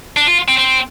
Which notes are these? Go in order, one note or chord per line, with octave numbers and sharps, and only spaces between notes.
D4
F4
C4
C4